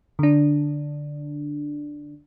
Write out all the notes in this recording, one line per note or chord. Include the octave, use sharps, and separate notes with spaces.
D3 D4